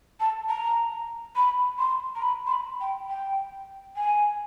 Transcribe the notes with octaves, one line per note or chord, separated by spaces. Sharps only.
A5
A#5
B5
C6
A#5
B5
C6
B5
G5
G5
G#5